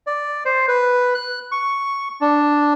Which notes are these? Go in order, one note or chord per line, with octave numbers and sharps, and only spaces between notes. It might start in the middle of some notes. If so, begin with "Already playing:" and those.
D5
C5
B4
F#6
C#6
D4